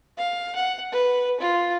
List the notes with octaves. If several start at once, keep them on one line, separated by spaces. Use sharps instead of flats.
F5
F#5
B4
F4